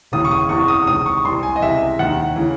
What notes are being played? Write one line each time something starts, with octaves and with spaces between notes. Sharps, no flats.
E1 D#2 C#3 E3 D#6
C#6
D#6
F#1 E2 C3 E3 C#6
D#6
C#2 C3 D#3 D#6
C#6
C2 C3 E3 C6
G#5
D#5
C#2 C3 E3 E5
D#2 D#3 F#5
C#3 E3